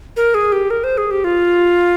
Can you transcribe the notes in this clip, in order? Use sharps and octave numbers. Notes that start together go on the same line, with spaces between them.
A#4
G#4
G4
A#4
C5
G#4
G4
F4